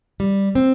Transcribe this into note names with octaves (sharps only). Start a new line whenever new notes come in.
G3
C4